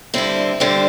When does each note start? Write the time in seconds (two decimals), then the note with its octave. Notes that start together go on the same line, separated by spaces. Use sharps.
0.14 G2 D3 G3 C4 E4
0.60 G2 D3 G3 C4